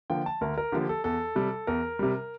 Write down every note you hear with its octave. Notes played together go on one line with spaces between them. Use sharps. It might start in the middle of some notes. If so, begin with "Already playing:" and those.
D3 F3 A#3 G5
A5
D2 A#4
A#4
D3 F3 A#3 G4
A4
E2 A4
C3 G3
E2 A#4
C3 G3